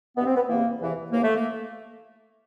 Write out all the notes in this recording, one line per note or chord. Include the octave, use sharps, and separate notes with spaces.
G2 E3 B3
C4
B3
E2 C3 E3 A#3
E2 C3 E3
D#2 C#3 E3 A#3
A3
A#3